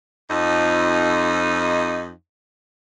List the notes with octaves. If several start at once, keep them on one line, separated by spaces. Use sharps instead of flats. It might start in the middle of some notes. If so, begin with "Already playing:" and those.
F2 D#4